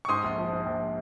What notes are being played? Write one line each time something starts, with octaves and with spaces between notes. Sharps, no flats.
C#6
G#2 C6 D#6
A#1
F3
G#2
A#1